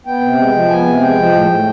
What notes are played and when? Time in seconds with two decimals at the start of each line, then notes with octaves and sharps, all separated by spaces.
0.06 B3 G5
0.21 C3
0.37 G#3
0.54 F3
0.70 B3 G#5
0.85 C3
1.01 G#3 G5
1.18 F3
1.33 A2
1.49 A2